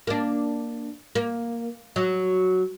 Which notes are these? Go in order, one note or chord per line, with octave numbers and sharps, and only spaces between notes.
A#3 D4
A#3
F#3